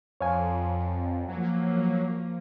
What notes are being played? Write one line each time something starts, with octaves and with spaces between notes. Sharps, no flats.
F2 C#5 F5 G#5
F3 F#3 A#3